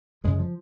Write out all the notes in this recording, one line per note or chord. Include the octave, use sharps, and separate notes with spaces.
F#2 C#3 F3 G#3
F3